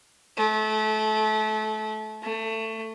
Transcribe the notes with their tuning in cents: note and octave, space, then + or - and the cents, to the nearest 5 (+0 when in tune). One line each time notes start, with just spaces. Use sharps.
A3 -25
A3 +20